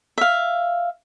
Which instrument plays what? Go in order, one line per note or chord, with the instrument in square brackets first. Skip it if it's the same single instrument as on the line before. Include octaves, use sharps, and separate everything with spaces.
[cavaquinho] E5 F5